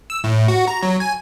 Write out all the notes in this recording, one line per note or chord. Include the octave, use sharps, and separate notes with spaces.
E6
A2
F#4
A#5
F#3
G#5